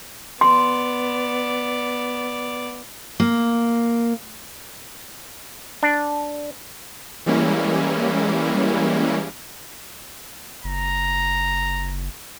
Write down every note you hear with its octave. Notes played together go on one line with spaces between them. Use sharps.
B3 D5 C6
A#3
D4
E3 G3 G#3 A#3 C#4 E4
F#1 A#5